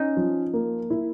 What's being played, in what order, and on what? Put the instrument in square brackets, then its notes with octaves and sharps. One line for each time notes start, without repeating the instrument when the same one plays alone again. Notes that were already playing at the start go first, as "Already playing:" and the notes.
Already playing: [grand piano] C#4 [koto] D#4
[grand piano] F3
A#3
E4